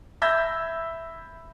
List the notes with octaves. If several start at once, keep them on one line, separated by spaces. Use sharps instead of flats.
E5 B5 E6 G6 G#6 A#6